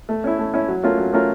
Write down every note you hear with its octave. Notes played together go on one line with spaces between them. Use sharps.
A3
C#4 E4
A3
C#4 E4
F#3
A3 C#4 F4 A#4
F#3
A3 C#4 F4 A#4